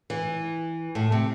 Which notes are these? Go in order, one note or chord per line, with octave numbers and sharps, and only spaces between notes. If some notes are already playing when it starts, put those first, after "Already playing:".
E3
A2
C3